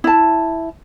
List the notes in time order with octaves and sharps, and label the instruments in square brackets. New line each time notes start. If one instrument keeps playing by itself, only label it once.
[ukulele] E4 A5